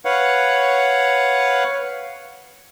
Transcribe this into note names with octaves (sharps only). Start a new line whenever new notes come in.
B4 C#5 F5 F#5